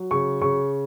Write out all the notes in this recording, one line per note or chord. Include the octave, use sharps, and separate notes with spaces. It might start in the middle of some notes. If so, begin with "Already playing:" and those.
Already playing: F#3
C#3 C#6
C#3 C#6